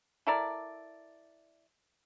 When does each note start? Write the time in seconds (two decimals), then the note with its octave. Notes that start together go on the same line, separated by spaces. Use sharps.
0.27 E4 A4 A#4 D5